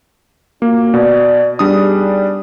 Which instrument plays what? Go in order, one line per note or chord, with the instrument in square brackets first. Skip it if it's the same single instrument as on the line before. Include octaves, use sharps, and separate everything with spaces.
[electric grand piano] A#3 [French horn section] C#4 F4 F#4
[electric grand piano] B2 [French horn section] D5
[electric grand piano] G3 D4 D#6 [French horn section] B3 D#4 G#4